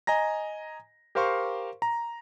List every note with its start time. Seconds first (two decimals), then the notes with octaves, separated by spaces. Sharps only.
0.07 D#5 G#5 A#5 A#6
1.15 G4 A#4 C5 F5 C6 C#6
1.82 A#5